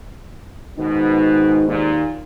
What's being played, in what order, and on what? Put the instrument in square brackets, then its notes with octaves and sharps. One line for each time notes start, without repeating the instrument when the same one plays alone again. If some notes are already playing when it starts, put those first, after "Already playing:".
[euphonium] G#2 [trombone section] B2 [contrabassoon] D#3
[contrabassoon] D#2 [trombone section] A#2